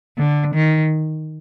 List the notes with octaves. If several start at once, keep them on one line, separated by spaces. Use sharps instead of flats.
D3
D#3